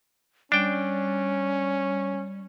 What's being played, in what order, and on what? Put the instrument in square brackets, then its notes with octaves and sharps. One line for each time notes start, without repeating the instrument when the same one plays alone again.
[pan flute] G3 [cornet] C#4 [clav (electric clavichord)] D4 G5